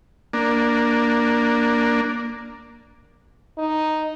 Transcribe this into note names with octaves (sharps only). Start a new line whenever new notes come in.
A#3 D4
D#4